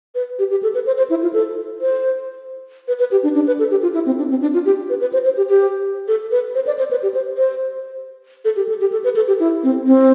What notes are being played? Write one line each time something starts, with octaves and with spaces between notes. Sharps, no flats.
B4
G4
G4
A4
B4
C5
C5
E4
F4
A4
C5
B4
B4
G4
D4
D4
B4
A4
G4
F4
E4
C4
D4
C4
D4
F4
G4
B4
B4
C5
C5
G4
G4
A4
B4
C5
D5
C5
B4
G4
C5
C5
A4
G4
A4
G4
A4
B4
A4
G4
E4
C4
C4